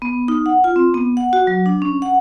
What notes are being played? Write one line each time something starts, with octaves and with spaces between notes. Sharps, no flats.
B3
D#4
F#5
F4
C4
B3
F#5
F#4
F#3
D4
C#4
F#5